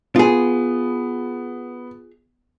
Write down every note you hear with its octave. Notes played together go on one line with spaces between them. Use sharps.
B3 F4 G#4